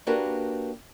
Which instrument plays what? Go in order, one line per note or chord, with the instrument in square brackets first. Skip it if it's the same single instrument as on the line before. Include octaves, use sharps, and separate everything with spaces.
[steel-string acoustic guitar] A#3 D4 F#4 G4 A#4 B4